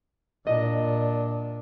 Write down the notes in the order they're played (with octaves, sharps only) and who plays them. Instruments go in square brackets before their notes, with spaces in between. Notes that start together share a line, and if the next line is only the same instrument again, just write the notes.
[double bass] A#2 D4 [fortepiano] D#5